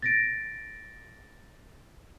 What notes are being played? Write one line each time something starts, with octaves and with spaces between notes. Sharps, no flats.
A6 A#6 D7